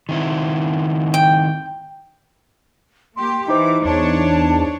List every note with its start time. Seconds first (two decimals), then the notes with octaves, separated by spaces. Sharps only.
0.09 D#3 C4 E4
1.14 G5
3.16 A#3 G4 C6
3.48 E3 D#4 E4 C5 D6
3.85 E2 D4 C#5 A5